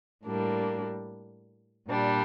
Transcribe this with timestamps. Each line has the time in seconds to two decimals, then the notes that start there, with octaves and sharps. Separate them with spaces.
0.24 A2 G3 A#3 D4
1.88 A#2 G3 D4